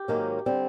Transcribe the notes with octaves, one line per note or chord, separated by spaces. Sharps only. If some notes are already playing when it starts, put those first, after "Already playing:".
Already playing: G4
G#2 D#3 F#3 A#3 C#4
D3 G3 C4